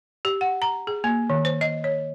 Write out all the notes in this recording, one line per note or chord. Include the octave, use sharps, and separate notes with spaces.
G4
F#5
A#5
G#4
A#3
D#3
C5
D#5
C#5